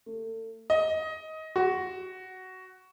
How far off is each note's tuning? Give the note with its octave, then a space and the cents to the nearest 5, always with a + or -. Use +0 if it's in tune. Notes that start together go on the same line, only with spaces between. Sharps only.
A3 +35
D#5 +20
F#4 +10